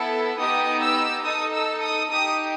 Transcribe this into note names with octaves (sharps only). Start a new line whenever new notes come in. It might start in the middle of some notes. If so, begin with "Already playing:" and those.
Already playing: B3 E4 A4
B3 D#4 G4 D#6
E6
D#4 A4 D#6
E6
D#6
D#4 G4 D#6